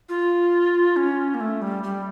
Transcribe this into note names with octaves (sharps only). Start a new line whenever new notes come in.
F4
C#4
A#3
A3
G3
G3